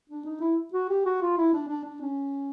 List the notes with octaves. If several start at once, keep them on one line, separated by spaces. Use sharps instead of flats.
D4
D#4
E4
F#4
G4
F#4
F4
E4
D4
D4
D4
C#4